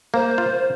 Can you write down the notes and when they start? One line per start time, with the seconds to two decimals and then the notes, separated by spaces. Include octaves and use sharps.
0.14 A#3 C5
0.38 F4